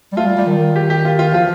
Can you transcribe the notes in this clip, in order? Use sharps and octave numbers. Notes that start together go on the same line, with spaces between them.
G3
A3 F4
G3
G3
D#3
G4
G4
F4
F4
F3 F4